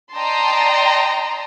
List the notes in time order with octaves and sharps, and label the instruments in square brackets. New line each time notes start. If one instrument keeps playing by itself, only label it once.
[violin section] D5 D#5 G5 A5 A#5 C6